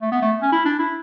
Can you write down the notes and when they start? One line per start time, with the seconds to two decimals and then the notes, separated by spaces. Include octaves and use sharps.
0.02 A3
0.12 B3
0.22 A3
0.42 C#4
0.52 E4
0.65 D4
0.79 E4